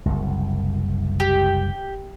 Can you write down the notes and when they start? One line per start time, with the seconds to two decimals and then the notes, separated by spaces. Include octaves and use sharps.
0.06 F#1 C2
1.20 G4